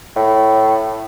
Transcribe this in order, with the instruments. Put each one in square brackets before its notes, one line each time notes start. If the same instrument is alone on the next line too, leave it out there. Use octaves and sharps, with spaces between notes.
[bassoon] A2